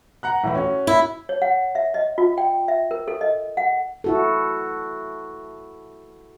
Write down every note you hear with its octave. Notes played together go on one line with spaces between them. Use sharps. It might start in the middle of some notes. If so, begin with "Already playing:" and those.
F#5 A#5 F#6
A2 E3 E4
C#4 F#4
E4
C#5
F#5
E5
D#5
F4
G5
E5
A#4
A4
D#5
F#5
E4 F#4 A4